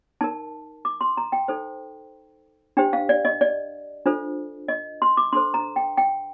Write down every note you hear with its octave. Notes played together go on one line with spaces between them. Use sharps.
D#4 A#4 A5
D6
C6
A#5
G5
D#4 A4 C5
D4 G4 C5 G5
F5
D5
D#5
D5
D4 F4 A4 C5
D#5
C6
D6
D4 A4 C5 C6
A#5
G5
G5